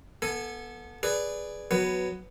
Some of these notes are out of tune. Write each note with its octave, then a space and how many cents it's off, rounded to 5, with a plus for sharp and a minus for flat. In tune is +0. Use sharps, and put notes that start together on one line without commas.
B3 -25 A4 +0 G#5 +0
G#4 +0 B4 +0 D5 +0
F#3 +0 B3 +10 B4 +0